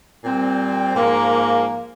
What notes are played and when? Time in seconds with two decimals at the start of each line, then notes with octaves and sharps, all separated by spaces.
0.24 A#2 G3 C4
0.95 G#2 F3 A#3